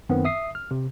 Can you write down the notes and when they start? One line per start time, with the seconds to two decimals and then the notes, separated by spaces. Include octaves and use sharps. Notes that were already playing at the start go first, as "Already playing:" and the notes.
0.09 F#2 D#3 B3 C4
0.25 E5 D#6 C7
0.55 F6
0.71 C3